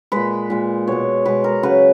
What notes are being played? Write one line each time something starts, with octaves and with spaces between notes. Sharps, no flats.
A#2 G#3 B4
A#2 G#3
B2 G#3 C#5
B2 G#3 B4
A#4
C#3 F#3 B4